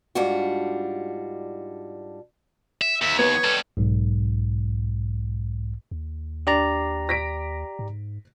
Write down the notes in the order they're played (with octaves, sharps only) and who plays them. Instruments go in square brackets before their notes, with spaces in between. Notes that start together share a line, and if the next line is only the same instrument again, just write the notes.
[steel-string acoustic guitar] G#2 G3 D4 F4 F#4
[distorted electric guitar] E5
[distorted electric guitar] D#2 [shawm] E5
[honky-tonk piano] B3 [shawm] C#5
[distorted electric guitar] G3 A4
[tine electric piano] B1 G#2
[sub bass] D#2
[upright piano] D4 [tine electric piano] G4 D5 A#5
[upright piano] A#6 B6 D7
[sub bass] G#2